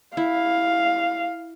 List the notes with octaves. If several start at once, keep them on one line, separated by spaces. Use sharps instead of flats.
E4 F5